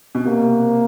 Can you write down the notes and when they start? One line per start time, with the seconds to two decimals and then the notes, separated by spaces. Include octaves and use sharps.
0.15 B2
0.24 C3 A#3